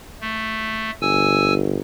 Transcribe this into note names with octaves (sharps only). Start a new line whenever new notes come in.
A3
G1 G#5 E6